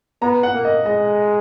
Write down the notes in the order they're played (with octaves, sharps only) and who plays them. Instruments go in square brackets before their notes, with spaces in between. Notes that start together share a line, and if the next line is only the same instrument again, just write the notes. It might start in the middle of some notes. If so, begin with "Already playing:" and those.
[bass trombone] B3 [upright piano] A#5
[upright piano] F#5
[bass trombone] A#3
[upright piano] D#5
[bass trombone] G#3 [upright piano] D#5